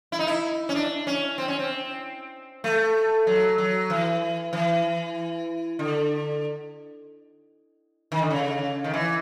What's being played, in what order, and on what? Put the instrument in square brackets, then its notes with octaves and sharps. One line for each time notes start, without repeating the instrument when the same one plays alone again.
[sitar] E4
D#4
E4
C#4
D4
C#4
C4
C#4
C4
A3
F#3
F#3
E3
E3
D3
D#3
D3
C#3
D#3
E3